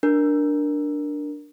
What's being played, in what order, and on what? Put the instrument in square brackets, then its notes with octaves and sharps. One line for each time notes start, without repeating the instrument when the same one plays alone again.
[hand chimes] D4 A#4